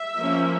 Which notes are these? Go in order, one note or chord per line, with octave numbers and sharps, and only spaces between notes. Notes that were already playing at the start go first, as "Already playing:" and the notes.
Already playing: E5
F3 A#3 C#4